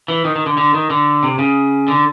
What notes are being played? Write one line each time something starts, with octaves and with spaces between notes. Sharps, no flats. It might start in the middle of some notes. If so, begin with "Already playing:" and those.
E3
D#3
D#3
D3
D3
D#3
D3
C3
C#3
D3